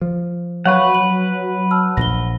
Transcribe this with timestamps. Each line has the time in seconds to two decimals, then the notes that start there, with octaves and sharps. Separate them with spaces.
0.01 F3
0.66 F#3 B4 C#5 F5 F#5 C#6
0.95 F#7
1.71 A5 E6 F6
1.97 A#1 A#6 G7